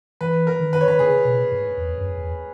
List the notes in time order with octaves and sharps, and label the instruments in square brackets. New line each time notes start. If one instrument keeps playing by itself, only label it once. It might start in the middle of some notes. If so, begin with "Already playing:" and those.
[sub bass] E3 [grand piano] B4
[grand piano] A#4
[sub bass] D#3
[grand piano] B4
C#5
[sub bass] D#3 [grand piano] B4
[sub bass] C#3 [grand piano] G#4
[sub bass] B2
G#2
E2
F#2
E2